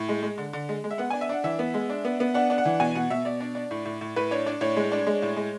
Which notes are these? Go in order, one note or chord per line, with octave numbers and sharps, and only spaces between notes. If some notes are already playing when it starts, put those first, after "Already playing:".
Already playing: A2
G#3
G#3
D3
D3
G#3
G#3
E5
B3 F#5
D4 G#5
E5
D4 F#5
E3 E5
B3
G#3
D4
B3
B3
D4 F#5
D4
F#5
E3
B2 G#5
B2 F#5
B2 E5
B2 D5
D4
D4
A2
A2
A2
A2 B4
D4 C#5
D4 D5
A2 C#5
G#3
D4
G#3
A2
G#3